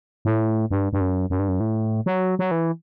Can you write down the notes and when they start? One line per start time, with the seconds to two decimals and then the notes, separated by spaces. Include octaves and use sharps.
0.25 A2
0.71 G2
0.93 G2
1.01 F#2
1.30 F#2
1.39 G2
1.49 F#2
1.60 A2
2.06 F#3
2.39 F#3
2.51 E3